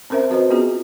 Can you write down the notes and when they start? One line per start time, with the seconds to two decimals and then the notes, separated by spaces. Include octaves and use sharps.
0.10 C4 C#4 A#4 C5 E5
0.30 C4 F#4 B4 C5 D#5
0.50 B3 C#4 F4 F#4 G#4